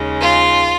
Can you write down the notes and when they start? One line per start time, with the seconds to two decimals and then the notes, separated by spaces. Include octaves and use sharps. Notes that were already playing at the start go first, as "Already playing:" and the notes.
Already playing: D#2 C#3 G#3
0.20 F4